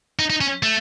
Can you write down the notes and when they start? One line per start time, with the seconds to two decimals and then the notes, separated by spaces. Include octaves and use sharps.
0.19 D#4
0.30 D#4
0.41 C#4
0.63 A3